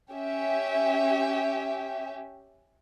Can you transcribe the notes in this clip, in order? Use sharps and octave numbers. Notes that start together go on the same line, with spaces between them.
C#4 G4 E5